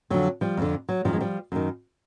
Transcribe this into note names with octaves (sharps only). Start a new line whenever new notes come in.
F2 D3 F#3
F3 G3
F2 D3
F#3
F#2 D#3 F3 G3
G#3
F3 G3
F#2 D#3